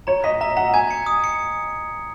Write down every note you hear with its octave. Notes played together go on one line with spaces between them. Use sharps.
C#5 A#5
D#5 B6
E5 A#5
F#5 A#5
G#5 G#6
C#7
D#6
C#7